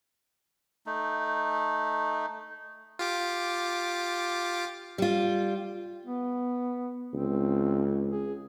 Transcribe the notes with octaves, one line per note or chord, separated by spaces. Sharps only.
A3 D#4
F4 G4 D6
G3 F4
B3
C#2 C4
G#4